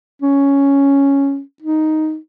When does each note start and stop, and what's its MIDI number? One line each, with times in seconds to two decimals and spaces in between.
0.22 1.40 61
1.62 2.17 63